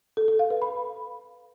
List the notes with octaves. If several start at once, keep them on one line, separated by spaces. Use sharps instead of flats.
A4
A4
F5
B4
B5